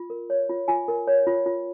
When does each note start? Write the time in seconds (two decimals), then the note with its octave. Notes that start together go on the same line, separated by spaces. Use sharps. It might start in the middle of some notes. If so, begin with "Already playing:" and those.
Already playing: F4
0.10 A#4
0.30 C#5
0.49 F4
0.68 F4 G#5
0.88 A#4
1.07 C#5
1.27 F4
1.46 F4